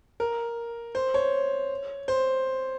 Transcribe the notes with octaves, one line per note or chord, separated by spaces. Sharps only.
A#4
C5
C#5
C5